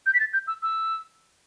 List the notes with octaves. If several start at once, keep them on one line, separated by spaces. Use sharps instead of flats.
G6
B6
A6
G6
E6
E6